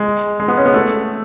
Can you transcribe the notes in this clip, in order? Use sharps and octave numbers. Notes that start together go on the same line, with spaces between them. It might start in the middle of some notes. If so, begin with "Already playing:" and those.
Already playing: G#3
G#3
B3
C#4
B3
A3